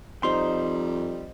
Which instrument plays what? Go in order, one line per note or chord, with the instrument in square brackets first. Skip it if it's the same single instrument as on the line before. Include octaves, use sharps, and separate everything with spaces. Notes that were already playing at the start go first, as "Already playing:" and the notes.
[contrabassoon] F2 [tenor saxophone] G3 [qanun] D#4 C5 [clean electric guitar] C6